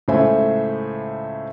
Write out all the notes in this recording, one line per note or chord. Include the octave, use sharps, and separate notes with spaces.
C#2 A2 A3 C5 E5 G#5